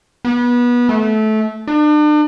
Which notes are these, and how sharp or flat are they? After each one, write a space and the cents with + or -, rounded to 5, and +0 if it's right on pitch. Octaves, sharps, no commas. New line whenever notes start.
B3 -25
A3 -20
D4 +40